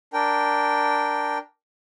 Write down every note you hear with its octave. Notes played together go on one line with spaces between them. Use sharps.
D4 A#4 G5